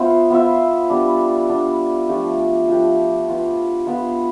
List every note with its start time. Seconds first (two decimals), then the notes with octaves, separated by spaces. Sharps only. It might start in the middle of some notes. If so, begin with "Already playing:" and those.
Already playing: B3 F4 C5 E5
0.30 B3 F4 C5 E5
0.89 G3 B3 D4
1.49 G3 B3 D4
2.09 F3 A3 D4 G4
2.68 F3 A3 D4 G4
3.28 B3 F4 B4
3.87 B3 F4 B4